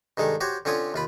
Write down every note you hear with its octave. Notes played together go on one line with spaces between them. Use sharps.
G2 D#3 G#3 A4
F#4 G4 C5 C#5
D3 C4 C#4 F4 C#5 D#6
D#2 F4 B5